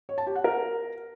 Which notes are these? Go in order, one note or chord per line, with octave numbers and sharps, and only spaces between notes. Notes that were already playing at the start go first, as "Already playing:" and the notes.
C#5
A5
G4
F#5
A#4